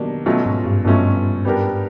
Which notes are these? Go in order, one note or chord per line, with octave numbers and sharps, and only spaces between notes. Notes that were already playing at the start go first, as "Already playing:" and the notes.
Already playing: B2 D#3 F#3 A#3 D4 G4
B2 F#3 A3 C#4 F4
G#2
G2
G2 B2 F#3 A3 C#4 F4
G3 B3 D4 G4 A#4